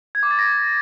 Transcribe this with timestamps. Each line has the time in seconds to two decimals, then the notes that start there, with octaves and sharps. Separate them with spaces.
0.15 G#6
0.23 D6
0.31 A6
0.39 A#6